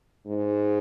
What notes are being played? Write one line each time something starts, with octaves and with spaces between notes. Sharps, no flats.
G#2